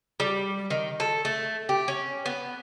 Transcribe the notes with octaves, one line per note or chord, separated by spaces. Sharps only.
G3
D#3
A4
A3
G4
C#4
B3